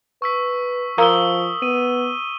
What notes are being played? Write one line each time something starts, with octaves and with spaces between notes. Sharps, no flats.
B4 C#6 E6 B6
F3 A#4 F5 A#5 D#6 E6 G7
B3 D#7